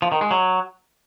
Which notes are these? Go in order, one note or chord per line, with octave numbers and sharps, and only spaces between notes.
F3
D#3
G#3
F#3